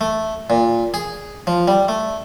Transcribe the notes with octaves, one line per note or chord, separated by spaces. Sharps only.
A3
A#2
G#4
F3
G3
A3